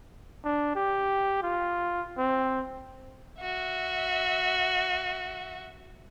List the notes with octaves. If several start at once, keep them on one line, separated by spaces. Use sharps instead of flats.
D4
G4
F4
C4
F#4 E5